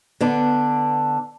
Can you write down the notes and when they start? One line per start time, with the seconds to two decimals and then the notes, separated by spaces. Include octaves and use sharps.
0.21 D3 B3 D4